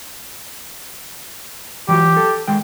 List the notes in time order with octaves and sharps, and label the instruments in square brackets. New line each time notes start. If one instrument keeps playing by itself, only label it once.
[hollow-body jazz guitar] E3 F#3 F#4 [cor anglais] G4
[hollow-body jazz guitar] A4
D#3 G#3 G5